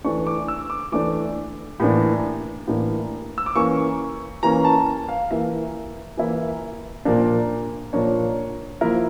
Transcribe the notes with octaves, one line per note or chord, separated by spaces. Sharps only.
E3 A3 D4 C#6
D6
E6
D6
E3 A3 D4 D6
A2 E3 A#3 D4
A2 E3 A#3 D4
E6
D6
E3 A#3 C#4 C#6
E3 A#3 C#4 A#5
A5
F5
E3 A#3 E4 E5
E3 A#3 E4
A#2 F3 A#3 D4
A#2 F3 A#3 D4 C#5
F3 A#3 E4 A#4